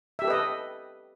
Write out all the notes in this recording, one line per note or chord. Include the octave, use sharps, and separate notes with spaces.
G4 A4 B4 D#5 E5